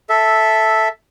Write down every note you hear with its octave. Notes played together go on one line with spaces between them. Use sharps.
A4 E5